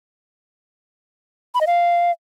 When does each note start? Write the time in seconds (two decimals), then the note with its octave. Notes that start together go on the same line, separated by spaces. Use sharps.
1.55 B5
1.61 D#5
1.67 F5